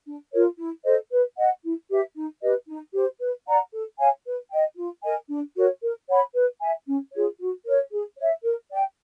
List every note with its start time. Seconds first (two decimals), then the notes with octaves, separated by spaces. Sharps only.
0.06 D4
0.32 F4 A#4 C#5
0.58 E4
0.84 A4 C5 D#5
1.12 B4
1.38 D#5 F#5
1.63 E4
1.90 G4 B4 E5
2.15 D#4
2.42 G4 B4 D#5
2.68 D#4
2.94 G4 C5
3.20 B4
3.47 D5 F#5 A#5
3.73 A4
3.98 C#5 F5 G#5
4.25 B4
4.51 D#5 G5
4.77 F4
5.03 A#4 D#5 G#5
5.29 D4
5.56 F#4 A#4 C#5
5.83 A#4
6.09 C#5 F#5 B5
6.35 B4
6.61 E5 G#5
6.86 C#4
7.13 F4 G#4 C#5
7.39 F#4
7.65 A#4 C#5
7.92 G#4
8.17 C#5 E5
8.44 A#4
8.70 D5 G5